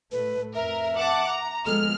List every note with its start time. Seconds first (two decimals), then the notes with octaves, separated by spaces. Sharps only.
0.12 A2 A3 B4
0.55 F2 A#4 E5
0.96 F#5 A5 D6
1.27 A#5
1.66 F3 G#3 B3 A4 F6